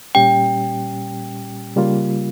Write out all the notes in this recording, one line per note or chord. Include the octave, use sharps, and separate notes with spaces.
A#2 G3 C#4 G4 G5
C#3 G3 A#3 F4